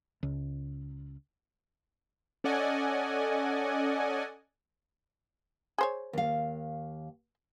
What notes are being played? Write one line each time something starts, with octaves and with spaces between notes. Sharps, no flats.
C#2
C#4 A4 D5 D#5 F#5 G#5
G#4 C5 C#5
D#2 F5